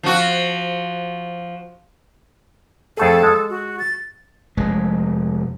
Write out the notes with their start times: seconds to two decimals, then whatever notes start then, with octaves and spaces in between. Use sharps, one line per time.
0.03 F3 F#4
2.97 F2 A3 G#4 A4
3.23 G#3
3.50 F#4
3.79 A6
4.57 F1 G#3